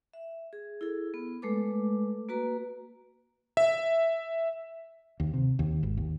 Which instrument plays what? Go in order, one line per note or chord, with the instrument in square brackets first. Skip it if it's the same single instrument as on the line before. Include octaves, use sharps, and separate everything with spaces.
[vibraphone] E5
G#4
E4 G#4 A4
B3
G#3 A3 A4 B4 D6
A#3 F#4 B4 A#5
[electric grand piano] E5
[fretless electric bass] D#2
C3
D#2
G#1
D#2